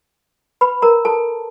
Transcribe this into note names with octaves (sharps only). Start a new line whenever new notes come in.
B4 B5
A#4 A#5
A4 A5